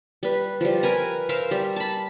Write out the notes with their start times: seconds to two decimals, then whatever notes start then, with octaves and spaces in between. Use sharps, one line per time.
0.23 G3 B4
0.61 F3 G3
0.83 A#4 B4 G#5 A#5
1.29 A#4 C5 E5 F5
1.51 G3
1.76 A5 B5